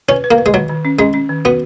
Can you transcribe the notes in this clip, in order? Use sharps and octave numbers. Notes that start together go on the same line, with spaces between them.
C#4 B4
B4
A#3
B4
G#3
D#3 F#3
D#3
C#4
G#3 C#4
C#4
D#3
B3 F#4